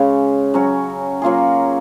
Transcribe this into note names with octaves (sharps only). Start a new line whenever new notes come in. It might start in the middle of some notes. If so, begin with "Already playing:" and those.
Already playing: C#3 G#3 C#4 F#4
F#3 C#4 F#4
F#3 A#3 F4 G#4